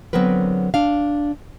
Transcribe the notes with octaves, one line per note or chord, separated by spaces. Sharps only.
D3 F#3 B3 C4 A#4 B4
D4 F5